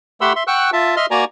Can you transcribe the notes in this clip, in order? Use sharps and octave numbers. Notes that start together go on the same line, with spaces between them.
A3 G4 F#5 B5 C6 E6
E5 C6
F#5 G5 C#6 E6 F#6
F4 E5 A5
D#5 E5 C6 F6
A#3 F#4 D5 G#5 A#5